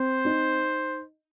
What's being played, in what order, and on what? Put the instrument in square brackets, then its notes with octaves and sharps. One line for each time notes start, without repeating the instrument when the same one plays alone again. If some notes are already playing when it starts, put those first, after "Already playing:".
Already playing: [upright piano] C4 [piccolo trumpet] C5
[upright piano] D#4